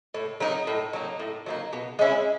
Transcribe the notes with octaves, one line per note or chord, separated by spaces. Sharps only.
A2
F#3 A#3 D#4
A2
F#3 A#3 D#4
A2
F#3 A#3 D#4
B2
G#3 C#4 E4